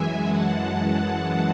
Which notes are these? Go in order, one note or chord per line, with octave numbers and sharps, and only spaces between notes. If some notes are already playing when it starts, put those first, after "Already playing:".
Already playing: F#2 E3 G#3 E5 G#5
F#5 A5